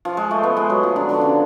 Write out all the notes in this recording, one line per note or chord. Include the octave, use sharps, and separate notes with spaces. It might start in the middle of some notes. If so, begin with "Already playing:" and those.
F3
G#3
A3
B3
G#3
F#3
F3
D3
D3
C#3